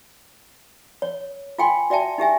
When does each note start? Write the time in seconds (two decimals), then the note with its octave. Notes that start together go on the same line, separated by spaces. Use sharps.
1.02 C#5
1.58 F4 F5 G5 G#5 C6
1.90 F#4 D5 E5 G5 A5
2.18 D#4 G4 E5 G#5